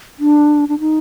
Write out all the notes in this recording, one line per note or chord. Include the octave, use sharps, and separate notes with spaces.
D4
D4
D#4